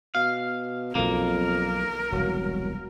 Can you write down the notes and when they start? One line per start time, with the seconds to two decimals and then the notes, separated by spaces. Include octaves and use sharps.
0.15 B2 F5
0.95 B1 F2 B2 A#3 A#4
2.12 E1 C2 F#3